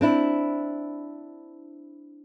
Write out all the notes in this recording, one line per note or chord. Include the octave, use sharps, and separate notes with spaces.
C4 D4 E4